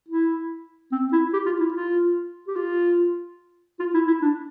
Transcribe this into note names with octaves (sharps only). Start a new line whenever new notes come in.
E4
C4
E4
G4
F4
E4
F4
G4
F4
F4
E4
E4
D4